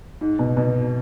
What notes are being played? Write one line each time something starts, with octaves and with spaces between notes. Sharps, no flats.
G#2
B2
B2